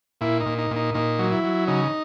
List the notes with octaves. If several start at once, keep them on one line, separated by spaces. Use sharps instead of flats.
A#2 E4
D#4
A#2
D#4
A#2
D#4
A#2 D#4
F#3
E4
F#3
C#3 D#4